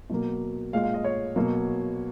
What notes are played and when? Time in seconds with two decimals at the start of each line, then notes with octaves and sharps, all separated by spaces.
0.10 B2 F#3 A#3
0.73 A#2 G#3 F5
0.84 F5
0.94 D#5
1.04 C#5
1.36 B2 F#3 A#3